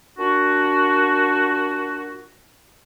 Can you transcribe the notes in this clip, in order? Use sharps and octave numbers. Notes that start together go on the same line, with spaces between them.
A#2 D4 F#4